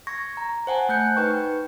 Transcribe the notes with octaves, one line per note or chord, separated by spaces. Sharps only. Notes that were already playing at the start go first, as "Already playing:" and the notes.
C#6 G#6 A#6
A#5
C5 F#5 G#5 A5
A3 F#6 G6 C#7
D#4 B4 G5 C#6